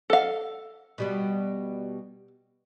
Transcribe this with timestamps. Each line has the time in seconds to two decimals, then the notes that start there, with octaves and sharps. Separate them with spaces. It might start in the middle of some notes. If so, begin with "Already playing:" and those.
0.10 A4 F5
0.98 B2 G3 B3